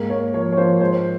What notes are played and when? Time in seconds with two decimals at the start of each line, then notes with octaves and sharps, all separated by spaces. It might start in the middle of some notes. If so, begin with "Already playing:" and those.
Already playing: G#2 A#3 A#4
0.10 A#3 C#5
0.34 F3 C#5
0.52 C#5
0.57 F3 C5
0.80 G#2 C5